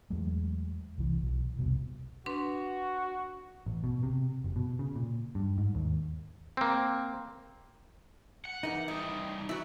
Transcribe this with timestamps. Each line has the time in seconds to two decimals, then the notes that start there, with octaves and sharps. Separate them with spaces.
0.10 E2 F#3 G#3 A3
0.98 C2 E3
1.23 B1
1.57 F1 C2 B2
2.26 D4 F#4 B4 C6
3.66 A1
3.84 B2
4.03 C3
4.44 F#1
4.56 B2
4.79 C#3
4.96 A#2
5.35 G2
5.58 G#2
5.75 D#2
6.57 A#3 C4
8.45 F#5
8.63 E3 D#4 A#4
8.88 E3 G3 D#5
9.49 E3 E4 F#4